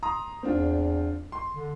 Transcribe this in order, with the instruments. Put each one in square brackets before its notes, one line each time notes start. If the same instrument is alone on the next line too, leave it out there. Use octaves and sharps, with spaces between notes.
[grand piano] A#5 C6 D#6
[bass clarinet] E2 [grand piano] C4 D4 F4
[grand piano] C6
[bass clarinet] D3